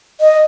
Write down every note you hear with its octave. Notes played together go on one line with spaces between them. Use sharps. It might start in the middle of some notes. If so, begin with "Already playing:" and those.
D#5